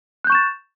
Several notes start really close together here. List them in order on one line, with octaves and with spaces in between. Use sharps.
F#6 G6 C#6 E7 A6